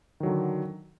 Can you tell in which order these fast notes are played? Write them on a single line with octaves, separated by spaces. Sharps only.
D#3 F#3 D3